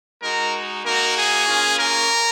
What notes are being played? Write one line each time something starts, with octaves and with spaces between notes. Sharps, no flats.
G#3 D#4 F#4 A#4
A#3 D#4 F#4 A#4
G#4
A#3 C#4 F4
A#4